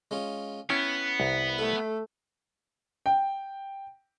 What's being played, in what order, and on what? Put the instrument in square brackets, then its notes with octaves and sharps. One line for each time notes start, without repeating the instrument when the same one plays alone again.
[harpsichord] G#3 C#4 F4
[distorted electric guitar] B3 [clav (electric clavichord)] C#4 E4 G5 [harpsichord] A5
[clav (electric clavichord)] C2 A#5
[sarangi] A3 [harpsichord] A4
[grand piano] G5